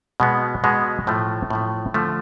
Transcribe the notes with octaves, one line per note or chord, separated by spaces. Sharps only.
B2 G#3 B3
B2 G#3 B3
A2 F3 A3
A2 F3 A3
D3 F3 A3